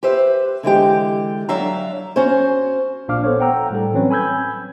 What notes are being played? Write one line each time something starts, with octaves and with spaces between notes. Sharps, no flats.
G4 B4 C5 E5
D3 E3 G#3 G4
F#3 D4 E5 F5 A#5
C#4 F#4 C5
A#1 A#2 D4 F5 D6 F6
B3 A4 C5 C#5
F#5 G5 A#5 E6
A2 G3 A4
E3 F#3 C4 C#4 B4 C#5
G#5 B5 E6 G6 G#6